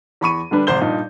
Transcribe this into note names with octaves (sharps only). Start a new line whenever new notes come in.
E2 B5 C#6 D#7
D3 G3 D4 B4
G#1 C3 C5 G6 G7
G2 A#2 D#4